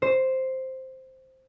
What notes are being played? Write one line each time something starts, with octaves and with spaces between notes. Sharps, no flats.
C5